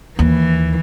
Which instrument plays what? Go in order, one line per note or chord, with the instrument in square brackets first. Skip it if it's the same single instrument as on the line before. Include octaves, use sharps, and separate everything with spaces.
[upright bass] D#2 [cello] E3